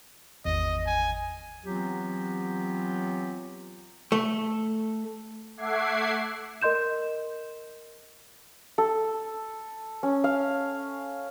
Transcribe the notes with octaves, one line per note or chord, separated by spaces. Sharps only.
G#1 E2 D#5
G#5
E3 F#3 B3 C4 F4 G4
A3
A3 E5 F#5 D6 G#6 C7
A#4 D#5 C6 G6 E7
A4
C#4
F5